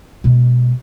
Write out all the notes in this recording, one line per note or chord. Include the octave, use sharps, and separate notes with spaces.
B2 G#3